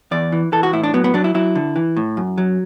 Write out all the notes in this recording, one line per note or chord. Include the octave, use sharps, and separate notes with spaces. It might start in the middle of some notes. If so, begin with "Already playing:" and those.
E2 D5
E3
E3 A4
F#4
A2 E4
D4
F#3 B3
B3
F#3 D4
E4
F#3 E4
D3
E3
A2
F#2
F#3